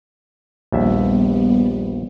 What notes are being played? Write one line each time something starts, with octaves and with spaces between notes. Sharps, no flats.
A#1 D#2 G3 B3 E5